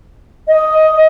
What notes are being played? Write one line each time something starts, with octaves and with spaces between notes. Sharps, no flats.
D#5